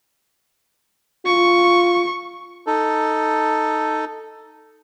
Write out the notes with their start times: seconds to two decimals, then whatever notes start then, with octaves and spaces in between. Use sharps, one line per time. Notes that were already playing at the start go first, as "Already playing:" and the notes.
1.25 F4 C#6
2.67 D#4 A4